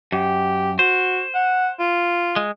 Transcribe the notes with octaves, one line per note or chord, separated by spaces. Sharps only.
F#2 G4
F#4 C5
F#5
F4
G#3